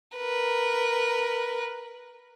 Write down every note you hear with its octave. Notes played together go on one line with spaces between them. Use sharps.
A#4 B4